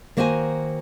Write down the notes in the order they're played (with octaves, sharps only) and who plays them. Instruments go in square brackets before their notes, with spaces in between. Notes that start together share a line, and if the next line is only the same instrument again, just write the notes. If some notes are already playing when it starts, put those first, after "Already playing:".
[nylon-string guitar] D#3 A#3 F#4 C5 E5 G#5